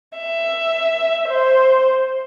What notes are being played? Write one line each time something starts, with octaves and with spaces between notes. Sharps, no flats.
E5
C5